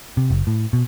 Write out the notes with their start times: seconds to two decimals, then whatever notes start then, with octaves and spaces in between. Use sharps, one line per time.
0.17 C3
0.30 F#1
0.47 A2
0.73 B2